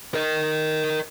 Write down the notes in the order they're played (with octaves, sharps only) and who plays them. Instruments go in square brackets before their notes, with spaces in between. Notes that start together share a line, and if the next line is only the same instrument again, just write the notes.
[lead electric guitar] A#4 D#5